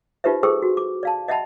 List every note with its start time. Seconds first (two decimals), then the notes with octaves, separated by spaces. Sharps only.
0.24 D#4 F4 G4 B4 C5 E5
0.43 G#4 A4 C5 G5 C#6 E6
0.62 F#4
0.77 D6
1.03 D5 F5 A5
1.28 D#5 E5 F#5 A5 B5